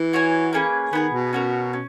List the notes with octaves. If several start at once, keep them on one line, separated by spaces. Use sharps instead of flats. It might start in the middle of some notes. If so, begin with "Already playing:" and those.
Already playing: E3
F#4 C#5 G#5
A#3 C#4 G#4 B4
D#3 B3 E4 G#4
B2
C#4 F#4 A#4
C#4